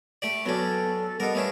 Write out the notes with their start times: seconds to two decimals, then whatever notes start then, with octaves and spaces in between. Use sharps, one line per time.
0.22 A3 G4 D5
0.46 F#3 B3 C#4 F#4 A4 D5
1.20 G3 B3 D#4 A#4
1.35 A3 B3 C#4 D4